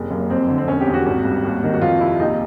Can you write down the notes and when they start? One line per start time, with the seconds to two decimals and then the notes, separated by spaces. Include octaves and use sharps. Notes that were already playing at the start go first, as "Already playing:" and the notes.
Already playing: F#1 C3
0.11 F#2 A#3
0.30 F2 C4
0.49 D3
0.58 C4
0.68 E1 C#4
0.80 G4
0.87 E2
0.94 F#4
1.06 G#1
1.25 G2
1.45 D#2
1.63 D#3
1.74 F#4
1.81 F2 F4
2.01 C3 E4
2.19 A#1 D#4